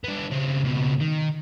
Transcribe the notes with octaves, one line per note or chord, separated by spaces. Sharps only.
B3 D4
C#3 C4
C#2 B2
D#3